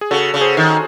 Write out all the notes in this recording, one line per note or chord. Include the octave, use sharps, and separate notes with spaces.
G#4
C#3 F#4 A4
C#3
G#4 C5
D#3